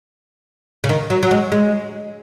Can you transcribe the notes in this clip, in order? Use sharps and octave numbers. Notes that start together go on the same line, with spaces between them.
C#3
D#3
F#3
F#3
G#3
G#3